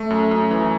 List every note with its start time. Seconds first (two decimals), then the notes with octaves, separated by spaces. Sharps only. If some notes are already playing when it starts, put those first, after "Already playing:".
Already playing: A3
0.10 F#2
0.31 F#2
0.51 E3